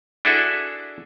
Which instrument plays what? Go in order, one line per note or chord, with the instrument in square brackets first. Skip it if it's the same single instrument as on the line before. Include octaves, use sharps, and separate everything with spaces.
[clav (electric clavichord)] D4 E4 F#4 G#4 A4 E5